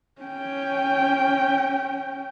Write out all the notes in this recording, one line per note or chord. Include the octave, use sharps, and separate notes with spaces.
C#4 G5